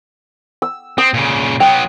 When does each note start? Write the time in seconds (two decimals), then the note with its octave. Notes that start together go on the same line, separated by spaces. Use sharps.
0.62 E6
0.98 C4 D#6
1.14 A#2 C#3
1.60 F#3 B3 G5